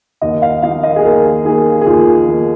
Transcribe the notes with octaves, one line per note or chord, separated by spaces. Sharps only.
D#2 D#5
F5
D#3 A#3 D#4 F5
D#5
G#4
D#2 A#4
D#3 A#3 D#4 G#4
G#4
D#2 F4
D#3 A#3 D#4